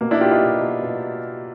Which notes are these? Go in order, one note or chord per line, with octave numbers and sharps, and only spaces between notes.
B2 A#3
D4 E4
B2 F4 G4
D#4 F4
B2
B2
B2